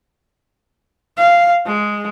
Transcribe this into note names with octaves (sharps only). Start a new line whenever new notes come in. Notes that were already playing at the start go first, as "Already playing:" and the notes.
F5
G#3